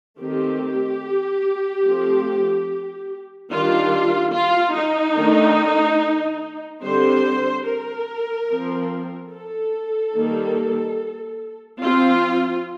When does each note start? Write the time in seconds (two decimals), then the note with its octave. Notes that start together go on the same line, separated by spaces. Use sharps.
0.20 D#3 A3 C4 G4
1.86 F3 A3 C4
3.52 D#3 G3 D4 F4
4.34 F4
4.76 D#4
5.17 D#3 A3 D4
6.83 D3 G3 C4 C5
7.66 A#4
8.49 F3 C4
9.32 A4
10.15 D#3 G3 A#3
11.81 F3 C4 F4